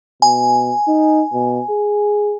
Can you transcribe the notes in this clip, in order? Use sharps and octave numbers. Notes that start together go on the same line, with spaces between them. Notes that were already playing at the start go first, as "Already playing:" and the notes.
B2 G#5
D#4
B2
G#4